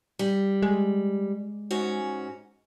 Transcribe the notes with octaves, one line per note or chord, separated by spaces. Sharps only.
G3
G#3
G#2 C#4 F#4